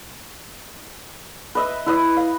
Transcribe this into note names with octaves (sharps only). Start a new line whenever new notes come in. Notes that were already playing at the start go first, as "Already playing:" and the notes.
B4 D#5 E5
E4 B4 D#5
F5